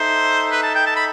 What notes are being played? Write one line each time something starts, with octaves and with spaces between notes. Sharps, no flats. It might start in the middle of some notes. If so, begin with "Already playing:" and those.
Already playing: D#4 A4 C5 E5
B4
A5
G5
A5
B5